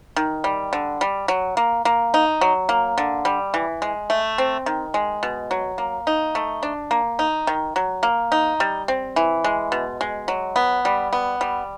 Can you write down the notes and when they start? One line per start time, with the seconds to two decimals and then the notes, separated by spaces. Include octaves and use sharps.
0.16 D#3
0.44 G3
0.73 D3
1.01 G3
1.28 F#3
1.57 A#3
1.85 A#3
2.14 D#4
2.41 F#3
2.69 A#3
2.98 D3
3.25 G3
3.54 E3
3.82 G#3
4.10 A3
4.38 C4
4.66 D#3
4.94 G#3
5.23 B2
5.51 F#3
5.78 A#3
6.07 D#4
6.35 A3
6.63 D4
6.91 A#3
7.19 D#4
7.47 D#3
7.76 F#3
8.03 A#3
8.32 D#4
8.60 G3
8.88 C4
9.16 E3
9.44 G#3
9.72 B2
10.01 G#3
10.28 F#3
10.56 B3
10.85 G3
11.13 B3
11.41 G3